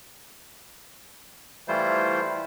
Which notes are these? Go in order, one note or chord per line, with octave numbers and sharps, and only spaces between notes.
E3 G3 A3 E4 F4 C5